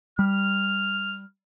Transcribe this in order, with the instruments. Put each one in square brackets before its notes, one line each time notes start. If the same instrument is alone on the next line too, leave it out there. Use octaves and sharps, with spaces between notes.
[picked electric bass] G3 [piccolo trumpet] F6